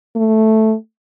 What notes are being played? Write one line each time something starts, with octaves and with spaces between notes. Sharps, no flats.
A3